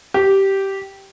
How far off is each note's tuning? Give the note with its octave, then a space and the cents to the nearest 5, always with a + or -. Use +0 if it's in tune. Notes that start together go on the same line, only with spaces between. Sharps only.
G4 -10